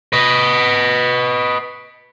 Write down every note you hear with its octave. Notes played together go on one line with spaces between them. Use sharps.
B4 D#5